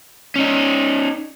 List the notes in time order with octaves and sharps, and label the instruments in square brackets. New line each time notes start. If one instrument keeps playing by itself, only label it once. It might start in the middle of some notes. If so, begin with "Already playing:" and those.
[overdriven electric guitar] C#4 D#4